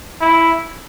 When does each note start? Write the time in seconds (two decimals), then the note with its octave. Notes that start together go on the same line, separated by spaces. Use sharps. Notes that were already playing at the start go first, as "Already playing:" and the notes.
0.21 E4